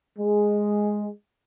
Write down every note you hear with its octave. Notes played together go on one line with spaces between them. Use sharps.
G#3